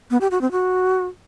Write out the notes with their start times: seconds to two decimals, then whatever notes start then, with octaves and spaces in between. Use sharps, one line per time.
0.11 B3
0.21 G4
0.31 F#4
0.41 C4
0.51 F#4